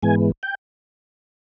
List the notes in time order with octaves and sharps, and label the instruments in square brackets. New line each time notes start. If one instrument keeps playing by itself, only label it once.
[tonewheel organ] G#2 E3 G#3 B3 G#5
G5